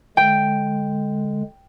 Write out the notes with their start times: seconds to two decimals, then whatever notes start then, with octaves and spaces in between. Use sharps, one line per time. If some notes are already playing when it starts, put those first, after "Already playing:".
0.17 D3 G#3 G5